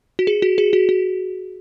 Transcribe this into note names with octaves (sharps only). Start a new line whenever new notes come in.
F#4
G#4
F#4
G#4
F#4
F#4